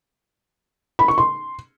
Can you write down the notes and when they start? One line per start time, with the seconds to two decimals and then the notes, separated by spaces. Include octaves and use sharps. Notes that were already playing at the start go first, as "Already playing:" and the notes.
0.99 B5
1.08 C#6
1.18 C6